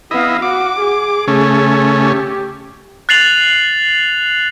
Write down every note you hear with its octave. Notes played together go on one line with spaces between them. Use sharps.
B3 E4 D#5 F5
F#4 D6
G#4
C#3 A3 C#4
G4
F#6 A6 C7 F7 F#7